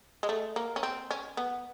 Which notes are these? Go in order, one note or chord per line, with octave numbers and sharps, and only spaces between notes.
G#3
A3
A#3
C#4
C4
C#4
B3